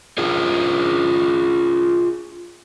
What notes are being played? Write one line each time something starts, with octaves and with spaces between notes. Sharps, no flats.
F4 G#4 A#4